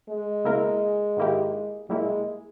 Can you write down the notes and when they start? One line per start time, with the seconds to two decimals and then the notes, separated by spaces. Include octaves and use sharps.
0.09 G#3
0.44 C#2 B2 A#3 E4 A#4
1.17 G#2 D#3 A#3 E4 G4
1.89 B1 A#2 G3 G#3 A#3 E4